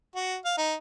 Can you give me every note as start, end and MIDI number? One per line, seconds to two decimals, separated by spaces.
0.15 0.37 66
0.45 0.53 77
0.58 0.74 63